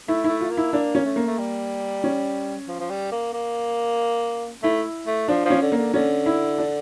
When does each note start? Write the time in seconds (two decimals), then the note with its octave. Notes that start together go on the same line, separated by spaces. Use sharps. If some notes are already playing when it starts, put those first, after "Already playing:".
0.08 A3 E4
0.24 A3 E4
0.41 F4
0.51 A#3
0.57 E4
0.73 A#3 D4
0.95 C#4
1.05 A3
1.16 A#3
1.27 A3
1.39 G3
2.04 C#4
2.68 F3
2.80 F3
2.90 G3
3.12 A#3
3.34 A#3
4.63 A3 E4
5.07 A3
5.28 F3 D4
5.45 F3
5.50 C#4
5.62 D3
5.72 A#3
5.78 D3
5.94 D3 C#4
6.26 E4
6.58 D4